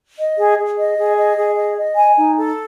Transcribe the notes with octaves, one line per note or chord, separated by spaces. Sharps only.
D#5
G#4
G#4
D#5
G#4
D#5
G#4
D#5
D#5
G#5
D#4
A4